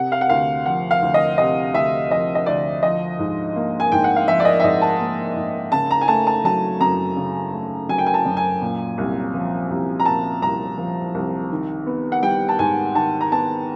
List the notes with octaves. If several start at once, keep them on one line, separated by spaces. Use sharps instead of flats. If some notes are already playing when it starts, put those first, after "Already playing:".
Already playing: C3 F#5
F5
F#5
D2 F5
F3 F#5
F5
D2
D#5
C3 D#5
D2 E5
F3 D#5
D#5
D2 D5
F3 D#5
G#2
A#3
G#5
G#2 G5
F#5
F5
F3 E5
D5
D#5
E5
G#2 D#5
A5
A#3
G#2
C#3 A5
A#5
G#5
A3 A5
A5
F#3 A5
F#2 A#5
C#3
A3
F#3 G#5
G5
G#5
A5
F#2
G#5
A#2
C2
F3
C2
A#5
A#2 A5
C2 A#5
F3
C2
D#3
B3
F#5
G3 G5
A5
G#2 G#5
D#3 A5
A#5
B3 A5